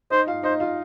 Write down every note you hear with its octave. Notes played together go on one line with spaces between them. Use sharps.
D#4 C5 D#5
F4 F5
D#4 C5 D#5
F4 F5